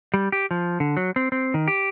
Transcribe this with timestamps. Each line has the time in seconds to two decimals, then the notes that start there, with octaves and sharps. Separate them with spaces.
0.14 G3
0.32 G4
0.51 F3
0.80 D3
0.97 F#3
1.16 C4
1.32 C4
1.54 D#3
1.68 G4